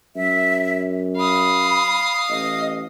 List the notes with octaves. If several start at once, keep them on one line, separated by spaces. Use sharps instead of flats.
F#2 E5
F5 B5 D#6
A1 D#5